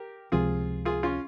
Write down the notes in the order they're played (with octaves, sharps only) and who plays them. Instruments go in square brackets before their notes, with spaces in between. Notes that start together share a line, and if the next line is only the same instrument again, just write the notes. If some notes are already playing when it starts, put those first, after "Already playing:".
Already playing: [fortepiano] G4 A#4
[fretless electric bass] C#2 C3 F3 C4 [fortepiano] F4 G#4
[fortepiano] F4 G#4
C#4 F4